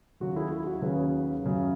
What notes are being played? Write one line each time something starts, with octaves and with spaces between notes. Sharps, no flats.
D#2 C#3 F#3 C#4 F#4
E4 G#4
E4
F#4
D#2 C#3 F#3 C#4 G#4 B4
F#2 C#3 F#3